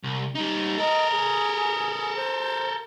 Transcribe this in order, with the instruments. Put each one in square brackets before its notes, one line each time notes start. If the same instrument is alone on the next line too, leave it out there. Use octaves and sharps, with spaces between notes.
[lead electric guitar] C2
G3 D#4
[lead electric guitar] A4 A#4 [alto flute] D#5
[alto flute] G#4
C5